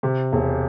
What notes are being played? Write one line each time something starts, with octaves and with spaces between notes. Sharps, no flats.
C3
E1